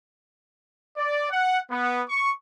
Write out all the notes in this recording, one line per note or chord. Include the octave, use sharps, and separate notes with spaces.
D5
F#5
B3
C#6